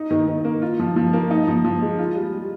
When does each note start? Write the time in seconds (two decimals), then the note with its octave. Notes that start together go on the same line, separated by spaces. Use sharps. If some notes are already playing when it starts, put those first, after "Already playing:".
Already playing: D#4
0.11 D#3
0.28 D#3
0.45 A#3
0.62 F4
0.79 F3
0.96 F3
1.13 A#3
1.31 D#4
1.47 F3
1.64 F3
1.82 G#3
1.99 F4
2.16 G3
2.33 G3